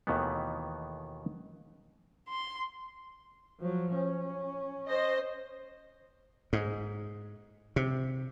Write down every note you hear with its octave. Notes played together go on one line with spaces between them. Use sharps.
D#2 B2 D#3 E3 A3 B3
C6
F3 F#3
C#4
C5 D#5
G#2
C3